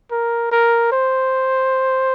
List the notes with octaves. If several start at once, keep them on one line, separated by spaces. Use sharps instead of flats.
A#4
A#4
C5